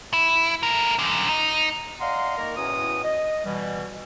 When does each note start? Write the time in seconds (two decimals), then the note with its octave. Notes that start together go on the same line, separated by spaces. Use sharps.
0.13 E4
0.63 A3 A#4
0.99 F#2 D3
1.29 D#4
2.00 D5 D#5 F5 F#5 A#5 C6
2.37 D#3 A#3 A#4 A#5
2.57 E2 A2 C#4 F#4 D#6
3.03 D#5
3.45 B2 E3 G3